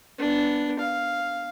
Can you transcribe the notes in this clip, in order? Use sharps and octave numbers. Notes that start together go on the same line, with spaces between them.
B3 D4
F5